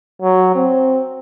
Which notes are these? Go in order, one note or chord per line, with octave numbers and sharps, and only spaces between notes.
F#3
C4